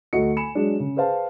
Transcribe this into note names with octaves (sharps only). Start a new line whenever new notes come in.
D2 A3 F#4 D#5 C#7
G#5 B5 C#7 E7
F#3 G#3 D4
C#3
G#4 B4 C5 F5 A5